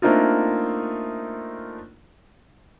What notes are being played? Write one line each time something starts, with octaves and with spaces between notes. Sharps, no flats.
A3 A#3 C4 D4 D#4 F4